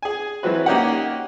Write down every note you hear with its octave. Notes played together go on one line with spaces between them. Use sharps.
G#4 G#5
E3 F#3 G#3 C4 F#4 B4
A#3 C#4 D#4 G4 A#4 F#5